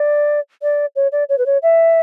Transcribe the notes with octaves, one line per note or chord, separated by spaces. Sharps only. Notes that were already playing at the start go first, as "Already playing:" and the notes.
Already playing: D5
D5
C#5
D5
C#5
B4
C#5
E5